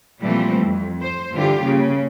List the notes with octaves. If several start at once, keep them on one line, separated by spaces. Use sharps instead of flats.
A#2 E3 F3 G3 A3 C4
F2
C5
G2 D3 E3 F4 G4
C#3 A#3